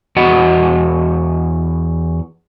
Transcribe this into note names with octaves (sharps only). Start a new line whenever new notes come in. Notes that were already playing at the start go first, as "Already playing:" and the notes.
E2 F#4 D#5 F#5